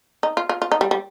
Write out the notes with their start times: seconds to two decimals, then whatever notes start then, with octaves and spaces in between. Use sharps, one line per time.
0.23 D#4
0.37 F4
0.49 F4
0.62 F4
0.72 D#4
0.81 G3
0.91 G3